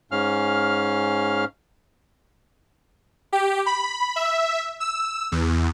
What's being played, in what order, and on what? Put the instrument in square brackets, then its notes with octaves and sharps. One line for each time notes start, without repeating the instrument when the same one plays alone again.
[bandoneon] G#2 C#4 F5 F6
[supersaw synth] G4
B5
E5
E6
E2